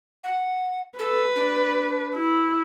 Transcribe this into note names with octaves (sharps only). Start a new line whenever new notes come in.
F#5
A4 B4
D4
E4